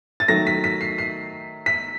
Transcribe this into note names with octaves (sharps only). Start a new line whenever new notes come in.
A6
D#3 F#3 A3 A#6
B6
B6
C7
C7
B6